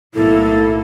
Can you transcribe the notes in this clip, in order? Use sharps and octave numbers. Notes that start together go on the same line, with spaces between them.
B1 A2 A#3 E4 A4